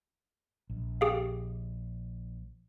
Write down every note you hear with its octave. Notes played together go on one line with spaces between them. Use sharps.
A#1
G4 G#4 F5